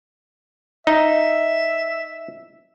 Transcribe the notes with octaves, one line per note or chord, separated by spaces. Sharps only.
D#4 E5